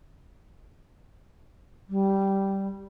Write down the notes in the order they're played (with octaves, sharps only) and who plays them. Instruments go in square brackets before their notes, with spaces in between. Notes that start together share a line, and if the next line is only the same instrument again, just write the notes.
[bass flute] G3